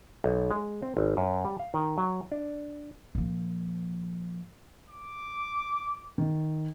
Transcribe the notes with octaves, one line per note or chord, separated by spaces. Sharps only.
B1
G#3
C4
G#1
F#2
G3
F5
D#3
F#3
D4
A#2 F3
D6
D#3